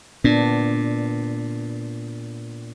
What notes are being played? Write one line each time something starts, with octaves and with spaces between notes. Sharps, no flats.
A#2 B3 D4